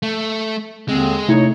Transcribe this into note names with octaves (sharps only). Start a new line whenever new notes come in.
A3
D#2 D3 G#3 C4
C3 A3 D#4 E4 C#5